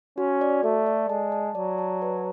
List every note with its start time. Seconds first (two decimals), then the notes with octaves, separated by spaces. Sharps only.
0.18 C#4 F#4
0.41 D5
0.63 A3 A4
0.86 D5
1.09 G#3 A5
1.32 A5
1.55 F#3 D5
1.78 A5
2.02 B4